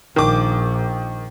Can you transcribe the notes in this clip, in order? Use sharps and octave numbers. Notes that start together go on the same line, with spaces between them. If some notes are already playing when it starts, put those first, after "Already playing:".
A#1 D#3 D6